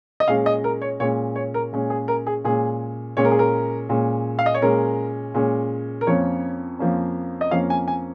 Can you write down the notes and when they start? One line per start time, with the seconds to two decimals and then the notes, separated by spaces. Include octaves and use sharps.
0.20 D#5
0.28 A#2 G#3 C#4 F5
0.46 D#5
0.64 A#4
0.82 C#5
1.00 A#2 G#3 C#4 C#5
1.36 C#5
1.54 A#4
1.73 A#2 G#3 C#4
1.90 G#4
2.08 A#4
2.27 G#4
2.44 A#2 G#3 C#4 G#4
3.17 A#2 G#3 C#4 C#5
3.25 A#4
3.31 G#4
3.39 A#4
3.89 A#2 G#3 C#4
4.39 F5
4.46 D#5
4.54 C#5
4.62 A#2 G#3 C#4 A#4
5.34 A#2 G#3 C#4
6.01 A#4
6.07 F2 F3 A#3 C#4 C#5
6.79 F2 F3 A#3 C#4
7.41 D#5
7.51 F2 F3 A#3 C#4 F5
7.70 G#5
7.88 G#5